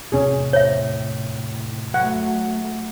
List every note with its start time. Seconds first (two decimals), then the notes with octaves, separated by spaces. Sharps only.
0.12 E2 A2 C3 C#4 G#4
0.53 C#5 E5
1.94 F#3 A3 F#5